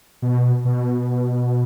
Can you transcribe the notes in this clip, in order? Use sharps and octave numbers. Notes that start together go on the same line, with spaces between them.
B2
B2